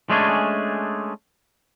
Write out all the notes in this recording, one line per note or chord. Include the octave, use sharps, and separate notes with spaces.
G#3 A3 C#4 D4 G#4